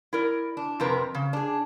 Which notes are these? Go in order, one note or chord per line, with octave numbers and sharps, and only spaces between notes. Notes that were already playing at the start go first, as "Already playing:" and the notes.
E4 A#4 D5
D4
F2 C3 C4 A#4 B4 A#5
C#3
D4 G#4